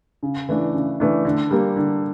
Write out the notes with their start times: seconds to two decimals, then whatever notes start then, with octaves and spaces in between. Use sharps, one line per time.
0.23 C#3
0.49 E3 A3 D4
0.74 C#3
1.00 E3 A3 D4
1.25 D3
1.51 G3 A#3
1.76 D3